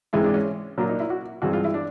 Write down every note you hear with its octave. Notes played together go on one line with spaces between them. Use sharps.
G#2 E3 G#3 C4 E4
D4
C#4
A#2 F#3 A#3 D4
D#4
E4
F#4
G2 E3 G#3 C4 F#4
F4
E4
D4